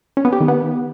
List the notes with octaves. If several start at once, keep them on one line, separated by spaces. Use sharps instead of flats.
C#4
B3
G4
D#3
B3